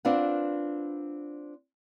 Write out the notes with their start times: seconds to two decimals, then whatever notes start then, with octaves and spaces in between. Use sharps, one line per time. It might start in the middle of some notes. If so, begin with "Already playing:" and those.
0.05 C4 D4 F4 B4 F#5